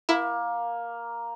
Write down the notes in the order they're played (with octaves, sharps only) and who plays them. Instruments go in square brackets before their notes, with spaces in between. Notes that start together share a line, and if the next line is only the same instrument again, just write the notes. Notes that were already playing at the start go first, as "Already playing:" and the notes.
[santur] A#3 [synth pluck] E4